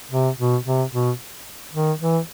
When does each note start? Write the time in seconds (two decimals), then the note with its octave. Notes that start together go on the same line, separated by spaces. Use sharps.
0.11 C3
0.38 B2
0.65 C3
0.92 B2
1.73 D#3
2.00 E3